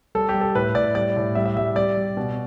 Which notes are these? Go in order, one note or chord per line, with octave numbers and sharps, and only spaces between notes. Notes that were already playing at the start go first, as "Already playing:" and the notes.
G3 A4
G4
G3
A4
A2 B4
A2 D5
G3 D5
A2
G3 E5
E5
G3 E5
G3 D5
G3
B2